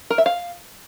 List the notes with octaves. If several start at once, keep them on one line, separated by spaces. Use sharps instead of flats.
A#4
E5
F5